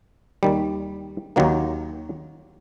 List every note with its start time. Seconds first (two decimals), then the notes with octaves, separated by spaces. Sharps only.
0.43 D#2 D#3 G3
1.36 D#2 D#3 F#3 A#3